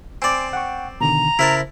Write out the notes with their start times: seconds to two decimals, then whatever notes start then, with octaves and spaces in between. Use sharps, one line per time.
0.22 C4 D5 G#5 C6 D6
0.53 F#5 G5 C#6
1.01 B2 D3 D#3 A#5
1.39 C#3 E4 A#4 C5 A5